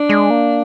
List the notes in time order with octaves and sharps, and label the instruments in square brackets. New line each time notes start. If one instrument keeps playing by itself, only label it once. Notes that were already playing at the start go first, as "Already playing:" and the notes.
Already playing: [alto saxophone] D4
[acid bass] G#3
A#3